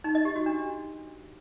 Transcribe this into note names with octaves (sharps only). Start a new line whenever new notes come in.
D#4
D#5
G4
F#4
D4